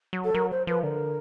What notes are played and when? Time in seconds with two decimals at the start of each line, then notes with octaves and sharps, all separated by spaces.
0.13 F#3
0.24 A4
0.35 F#3 A#4
0.51 C5
0.67 F3 B4
0.83 D3 A#4